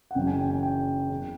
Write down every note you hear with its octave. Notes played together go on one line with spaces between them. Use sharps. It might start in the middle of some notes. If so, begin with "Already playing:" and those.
F#5
F#1 F#2 C#3 E3 G5
G#5
G5
G5
G5
E2 C#3